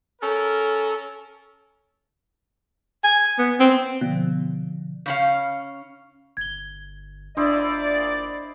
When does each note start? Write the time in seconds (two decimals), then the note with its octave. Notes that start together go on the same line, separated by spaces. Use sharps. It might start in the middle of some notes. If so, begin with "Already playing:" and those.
0.21 C#4 A4 A#4
3.04 G#5
3.38 B3
3.59 C4
4.01 B2 D3 F3
5.06 C#3 C#4 F5
6.37 G1 G#6 G7
7.37 F#1 A#2 D4 E4 C5 D5 D#5